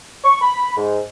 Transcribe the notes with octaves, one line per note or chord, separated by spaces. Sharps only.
C#6
B5
G#2